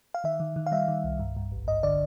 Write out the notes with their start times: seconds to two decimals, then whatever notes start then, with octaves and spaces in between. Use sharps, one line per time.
0.14 F5
0.24 D#3 E5
0.40 D#3
0.56 D#3
0.66 F5
0.72 G3 E5
0.88 D#3
1.04 C2
1.19 G2
1.36 G2
1.52 G#1
1.68 G2 D#5
1.83 D3 D5